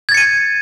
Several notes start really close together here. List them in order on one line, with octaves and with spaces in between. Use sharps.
G#6 A6 C#7 D#7